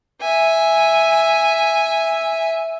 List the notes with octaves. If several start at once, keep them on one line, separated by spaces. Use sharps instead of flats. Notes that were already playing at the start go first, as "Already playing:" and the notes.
E5 G#5